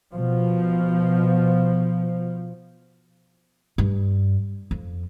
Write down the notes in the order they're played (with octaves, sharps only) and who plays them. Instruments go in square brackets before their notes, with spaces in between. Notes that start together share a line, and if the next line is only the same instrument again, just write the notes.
[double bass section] B2 F3
[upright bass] G2
F2